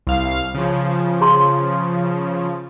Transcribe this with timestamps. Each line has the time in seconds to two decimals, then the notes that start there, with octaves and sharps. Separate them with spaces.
0.07 C2 F5
0.55 C#3 F3
1.21 G#4 A#5 C6